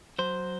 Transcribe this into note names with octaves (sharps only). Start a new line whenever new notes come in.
F#3 C5